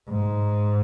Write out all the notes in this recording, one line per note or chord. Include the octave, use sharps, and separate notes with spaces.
G#2